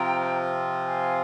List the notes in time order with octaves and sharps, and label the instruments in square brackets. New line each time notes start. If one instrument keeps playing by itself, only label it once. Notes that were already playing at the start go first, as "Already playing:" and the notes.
Already playing: [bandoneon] C3 F3 C4 F4 [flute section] G5 A#5
[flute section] F5 G#5